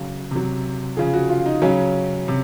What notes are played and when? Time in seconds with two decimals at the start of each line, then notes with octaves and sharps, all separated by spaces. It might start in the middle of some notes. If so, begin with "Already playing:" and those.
Already playing: C#3 F#3
0.31 C3 F#3
0.97 C#3 F3 G#4
1.13 F#4
1.29 F4
1.46 D#4
1.62 C#3 F#3 C#4
2.28 C3